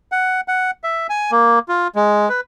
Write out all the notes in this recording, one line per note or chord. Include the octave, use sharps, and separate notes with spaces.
F#5
F#5
E5
G#5
A#3
F4
G#3
B4